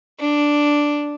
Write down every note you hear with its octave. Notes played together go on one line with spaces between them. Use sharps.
D4